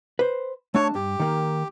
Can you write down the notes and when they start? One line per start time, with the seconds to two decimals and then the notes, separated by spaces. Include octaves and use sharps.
0.19 B4 C5
0.74 A3 D4 C#5 A5
0.95 G2 G4
1.20 D#3 A#3